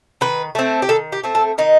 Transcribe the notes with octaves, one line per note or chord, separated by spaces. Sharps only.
D#3 B4
A3 C4
G4
D#3 A4
G4
A3 C4
A4
D#3 D#4